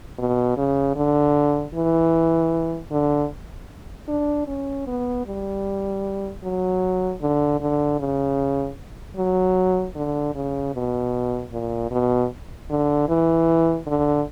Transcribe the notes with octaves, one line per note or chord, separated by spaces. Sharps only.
B2
C#3
D3
E3
D3
D4
C#4
B3
G3
F#3
D3
D3
C#3
F#3
D3
C#3
B2
A#2
B2
D3
E3
D3